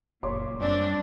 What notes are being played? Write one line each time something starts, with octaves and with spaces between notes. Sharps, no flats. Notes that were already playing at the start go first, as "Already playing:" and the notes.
F#1 A#2 C#5 C6 D6
F#2 G3 C4 D4 D5